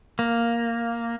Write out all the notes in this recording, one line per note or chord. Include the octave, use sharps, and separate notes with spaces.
A#3